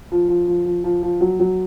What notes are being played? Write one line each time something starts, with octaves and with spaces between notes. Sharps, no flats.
F3
F3
F3
F3
F3
F3
F#3
F#3